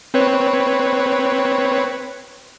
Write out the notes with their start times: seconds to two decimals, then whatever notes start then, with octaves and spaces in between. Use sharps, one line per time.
0.14 C4 B4 C#5